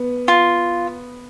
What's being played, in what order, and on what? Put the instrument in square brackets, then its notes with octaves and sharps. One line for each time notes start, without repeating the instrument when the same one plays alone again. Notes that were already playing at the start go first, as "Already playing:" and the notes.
Already playing: [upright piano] B3
[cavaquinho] F4